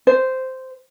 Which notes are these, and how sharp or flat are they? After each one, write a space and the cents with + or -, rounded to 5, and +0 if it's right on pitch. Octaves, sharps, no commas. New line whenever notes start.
C5 -10